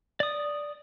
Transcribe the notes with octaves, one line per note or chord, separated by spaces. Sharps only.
D5 D#6